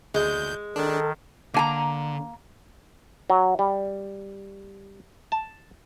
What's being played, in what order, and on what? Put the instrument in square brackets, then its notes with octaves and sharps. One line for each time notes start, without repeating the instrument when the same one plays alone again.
[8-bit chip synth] D2 G6 [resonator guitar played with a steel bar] G#3
[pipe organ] D#3 [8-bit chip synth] D4 [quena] A4
[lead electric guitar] D3 [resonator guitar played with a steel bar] A#3 G#5 A#5
[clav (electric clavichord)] F#3
G3
A5